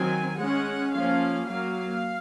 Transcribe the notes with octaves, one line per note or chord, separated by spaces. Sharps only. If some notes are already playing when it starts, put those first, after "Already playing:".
Already playing: D#3 F#3 C4 G#5
G#3 C#4 F#5
F3 A#3 C#4 F5
F#3 A#3 F5